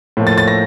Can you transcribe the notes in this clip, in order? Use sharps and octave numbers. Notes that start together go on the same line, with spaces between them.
A2 F3 A#3
A6
A6
A#6